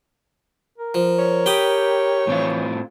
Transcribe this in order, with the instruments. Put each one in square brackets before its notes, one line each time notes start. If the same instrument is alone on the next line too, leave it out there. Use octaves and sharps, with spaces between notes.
[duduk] A#4
[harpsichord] F3
[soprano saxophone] C#5
[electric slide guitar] G4 [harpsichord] G5 B5 D#6
[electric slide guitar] A2 C4 F4 [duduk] E3